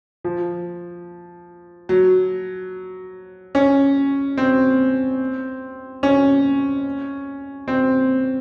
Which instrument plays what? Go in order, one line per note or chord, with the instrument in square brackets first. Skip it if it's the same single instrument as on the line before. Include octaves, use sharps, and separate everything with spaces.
[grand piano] F3
F#3
C#4
C4
C#4
C4